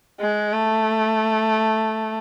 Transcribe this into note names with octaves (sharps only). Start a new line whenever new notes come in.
G#3
A3